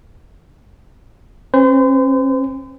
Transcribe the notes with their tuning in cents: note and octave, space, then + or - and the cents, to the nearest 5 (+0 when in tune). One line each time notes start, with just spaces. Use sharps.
C#4 -45 C5 -40